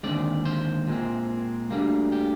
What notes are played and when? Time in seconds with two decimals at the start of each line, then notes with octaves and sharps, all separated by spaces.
0.03 D#2 D3 G#3 C4 D5
0.45 C5
0.87 A#2 G#3 C4
1.71 D2 D3 G3 A#3
2.12 G4